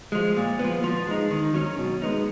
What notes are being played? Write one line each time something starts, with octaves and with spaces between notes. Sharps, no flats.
F3 G#3
A#2
F3 B3
F3
G#3 D#4
D#3
F#3 C#4
B2
G#3 B3 D#4